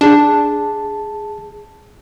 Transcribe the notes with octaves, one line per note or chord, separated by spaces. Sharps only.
D4 G#4 A5